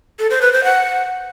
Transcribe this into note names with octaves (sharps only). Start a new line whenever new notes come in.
A4
C5
B4
C5
F#5